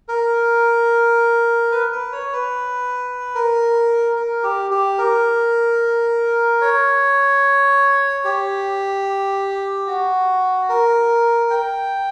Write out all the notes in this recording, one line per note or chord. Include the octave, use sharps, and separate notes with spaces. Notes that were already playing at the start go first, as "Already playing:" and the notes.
A#4
B4
B4
C#5
B4
A#4
A#4
G4
G4
A#4
C#5
G4
F#4
A#4
G5